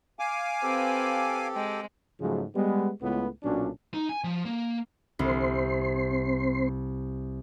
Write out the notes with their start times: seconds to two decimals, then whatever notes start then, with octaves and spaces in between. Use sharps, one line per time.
0.19 F5 G#5 D6
0.63 C4 G4 A4 B4
1.55 G#3 G5
2.20 G#2 C#3 F3 F#3 G#3 A3
2.54 G3 G#3 B3
3.02 C#2 A2 B3
3.43 B1 A#2 F#3 C#4 D4
3.94 D#4
4.09 G#5
4.24 F3
4.45 A#3
5.19 C2 C4 C6